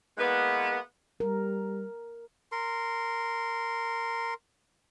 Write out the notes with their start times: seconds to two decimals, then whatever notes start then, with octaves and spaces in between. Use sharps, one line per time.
0.18 E3 G#3 A#3 B3
1.20 G3 A#4
2.52 A#4 C6